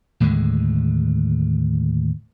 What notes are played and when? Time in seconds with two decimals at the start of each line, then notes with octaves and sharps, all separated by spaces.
0.20 D#2 A2 D3 G#3